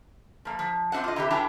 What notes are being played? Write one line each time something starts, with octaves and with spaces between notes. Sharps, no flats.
F3 A#3
F3
C4 D4 D#4 C5 F#5
F4 D#5
C3 E3 F#4 G4
A2 E3 F#3 D4 G5 A#5